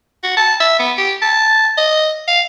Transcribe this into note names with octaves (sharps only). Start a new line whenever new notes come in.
F#4
A5
E5
B3
G4
A5
D#5
F5